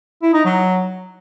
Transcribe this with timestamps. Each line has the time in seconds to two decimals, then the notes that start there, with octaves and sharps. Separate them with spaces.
0.22 E4
0.34 D#4
0.45 F#3